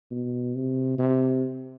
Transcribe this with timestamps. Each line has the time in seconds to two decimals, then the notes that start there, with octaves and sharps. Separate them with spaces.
0.11 B2
0.55 C3
0.99 C3